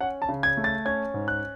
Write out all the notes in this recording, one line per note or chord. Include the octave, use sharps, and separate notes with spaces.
C#4 F#5
A5
C#3
G#6
A3
A6
C#4 G#6
G#2
F#6